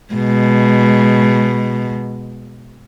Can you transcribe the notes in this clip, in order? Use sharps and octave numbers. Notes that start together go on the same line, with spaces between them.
B2 G#3